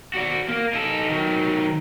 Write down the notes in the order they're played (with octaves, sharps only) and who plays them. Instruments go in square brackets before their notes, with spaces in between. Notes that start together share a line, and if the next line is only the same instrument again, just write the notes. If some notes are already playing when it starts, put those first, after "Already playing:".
[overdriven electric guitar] F#4 D5
A#3
D#4 A4
D#3 F#3